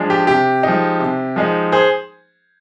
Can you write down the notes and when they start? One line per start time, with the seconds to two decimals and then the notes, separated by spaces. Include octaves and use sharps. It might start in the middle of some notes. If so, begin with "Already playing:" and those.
Already playing: F3 G#3 D4
0.10 G4
0.27 C3 G4
0.63 F3 G#3 D#4
1.00 C3
1.36 F3 G#3 D#4
1.72 G#4 C5